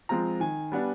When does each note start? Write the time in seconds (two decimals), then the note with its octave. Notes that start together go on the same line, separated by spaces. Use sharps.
0.09 F3 G#3 C4 F4 A#5
0.40 D#3 G#5
0.72 G3 B3 D4